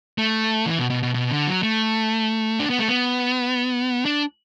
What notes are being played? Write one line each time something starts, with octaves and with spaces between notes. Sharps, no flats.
A3
E3
B2
B2
B2
B2
D3
F#3
A3
D4
B3
A3
B3
D4